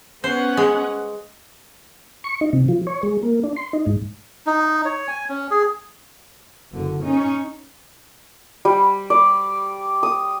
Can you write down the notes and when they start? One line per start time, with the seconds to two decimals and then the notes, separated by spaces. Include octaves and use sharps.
0.24 B3 C#4 C5 F#5
0.57 G#3
2.24 C#6
2.41 D#4
2.53 C3
2.68 F3
2.87 C#5
3.03 G#3
3.23 A#3
3.44 D4
3.56 C6
3.73 D#4
3.86 G#2
4.47 D#4
4.85 C#5
5.08 G#5
5.29 C#4
5.51 G#4
6.72 F#1 D3
7.03 C#4 D#4
8.65 G3
9.10 D5
10.03 D#6